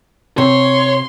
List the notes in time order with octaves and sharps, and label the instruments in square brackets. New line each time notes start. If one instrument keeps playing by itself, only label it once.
[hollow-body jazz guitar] C3 [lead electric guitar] C#5 [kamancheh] C6